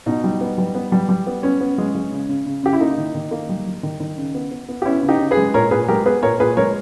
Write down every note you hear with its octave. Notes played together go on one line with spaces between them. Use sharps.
B2 D#4
G3
B3
G3
B3
G3
G3
B3
B3 C#4
B3
G#3
G#3
C#3
C#3
C#3
C#3 G4
E4
A#3 D#4
D#3
D#3
A#3
G3
G3
D#3
D#3
C#3
B3
B3
B3
G4
B3 C#4 E4
C#3
D#4 G4
C#3
G#4 B4
G#3
A#2 A#4 C#5
A#2 G#4 B4
G#3 G4 A#4
B3 G#4 B4
A#2 A#4 C#5
A#2 G#4 B4
G#3 A#4 C#5